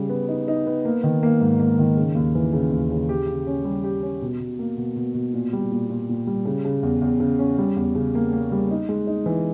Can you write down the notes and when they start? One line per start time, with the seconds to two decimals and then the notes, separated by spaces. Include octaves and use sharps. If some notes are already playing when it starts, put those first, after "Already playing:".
Already playing: C#3 G3
0.09 B3
0.28 D#4
0.48 D#4
0.67 B3
0.85 A#3
1.04 D#3
1.23 A#3
1.41 G#2
1.60 A#3
1.79 D#3
1.96 C#3
2.15 D#2
2.35 E3
2.53 C#3
2.72 D#2
2.91 C#3
3.09 G4
3.27 C#3
3.47 C#4
3.65 G3
3.84 G4
4.02 C#4
4.22 B2
4.40 B2
4.59 A#3
4.77 B2
4.96 B2
5.14 B2
5.34 A#2
5.53 G3
5.71 A#2
5.89 A#2
6.09 A#2
6.27 G3
6.45 C#3
6.65 C#3
6.83 E2
7.02 E2
7.20 C#3
7.39 C#4
7.58 G3
7.76 E2
7.95 C#3
8.15 A#3
8.33 A#3
8.52 G3
8.71 D#4
8.89 G#3
9.07 D#4
9.26 E3